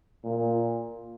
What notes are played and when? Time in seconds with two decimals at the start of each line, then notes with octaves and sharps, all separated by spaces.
0.24 A#2